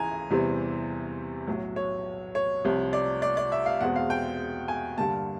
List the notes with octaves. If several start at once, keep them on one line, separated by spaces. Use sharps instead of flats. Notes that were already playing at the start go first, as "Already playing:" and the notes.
Already playing: C#2 C#3 E3 G#5 A#5
E2 C3 E3 G3 C4
B1 A2 F#3
C#5
C#5
C2 C3 F3
D5
D5
D5
E5
F5
E2 B2 G#3 C4 F#5
F5
G5
G#5
G2 D3 G3 A#3 A5